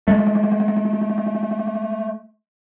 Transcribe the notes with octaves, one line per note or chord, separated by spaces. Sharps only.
G#3 A3